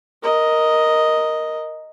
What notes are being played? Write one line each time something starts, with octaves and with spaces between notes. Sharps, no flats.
A#4 D#5